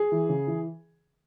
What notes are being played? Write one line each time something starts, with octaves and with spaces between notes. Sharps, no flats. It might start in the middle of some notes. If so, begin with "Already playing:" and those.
Already playing: G#4
E3
C#3
E3